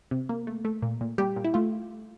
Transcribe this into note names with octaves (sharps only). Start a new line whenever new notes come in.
C3
A#3
A3
A3
A#2
A#2
A#2 G3 G4
A#2
E4
A3 F4